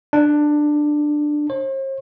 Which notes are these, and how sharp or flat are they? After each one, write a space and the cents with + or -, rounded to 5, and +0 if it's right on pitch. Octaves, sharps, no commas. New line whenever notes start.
D4 +15
C5 +45